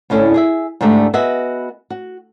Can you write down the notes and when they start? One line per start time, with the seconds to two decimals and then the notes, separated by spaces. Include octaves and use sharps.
0.10 D2 A2 C#4 D4 A4
0.34 G#4 D5 E5
0.81 G#2 D3 A3 D4 G4
1.14 B3 F#4 G#4 B4 D#5 E5
1.90 F#4